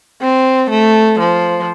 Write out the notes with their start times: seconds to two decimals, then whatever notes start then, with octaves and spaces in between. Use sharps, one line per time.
0.21 C4
0.70 A3
1.19 F3